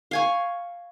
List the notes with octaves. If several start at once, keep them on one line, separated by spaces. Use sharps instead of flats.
F5 G#5 C#6